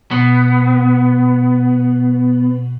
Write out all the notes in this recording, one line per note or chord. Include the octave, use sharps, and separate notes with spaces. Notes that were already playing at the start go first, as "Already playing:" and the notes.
B2 B3